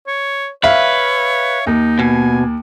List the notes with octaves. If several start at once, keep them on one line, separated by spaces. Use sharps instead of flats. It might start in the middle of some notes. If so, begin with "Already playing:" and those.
C#5
B4 C#5 E5 F5
D#2 D#4
B2 G#5